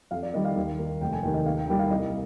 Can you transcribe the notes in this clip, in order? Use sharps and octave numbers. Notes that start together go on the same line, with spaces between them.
F2 F5
D5
D#3 G3 A#3 D#5
F5
D#2
D#3 A#3
F1 G5
G#5
D#2 D#3 A#3 G5
D#5
D#2 F5
G5
D#3 G3 A#3 G5
F5
C2 D#5